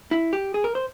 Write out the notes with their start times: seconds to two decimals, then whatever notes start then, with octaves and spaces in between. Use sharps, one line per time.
0.11 E4
0.33 G4
0.54 G#4
0.64 A#4
0.75 C5